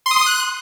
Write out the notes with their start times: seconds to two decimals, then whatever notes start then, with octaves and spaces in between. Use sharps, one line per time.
0.06 C6
0.11 D#6
0.16 C6
0.21 D#6
0.26 F#6